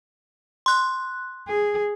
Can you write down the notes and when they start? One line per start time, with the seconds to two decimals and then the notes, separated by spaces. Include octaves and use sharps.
0.66 C6 F#6
1.48 G#4